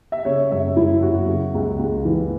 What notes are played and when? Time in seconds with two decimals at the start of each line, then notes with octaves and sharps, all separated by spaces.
0.12 E5
0.25 C#3 C#5
0.51 F#2 E5
0.77 F#2 E4
1.02 F#3 F#4
1.28 C#3
1.54 C#2
1.79 C#2
2.05 E3